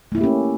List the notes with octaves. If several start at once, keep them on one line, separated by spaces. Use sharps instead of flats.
A3 A#3 C#4 E4 G4